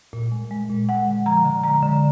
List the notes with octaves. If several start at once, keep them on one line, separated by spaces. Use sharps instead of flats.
A#2
G#3
G#3
A#2
G#3 F#5
D3
F3 A#5
D3
G#3 A#5
D3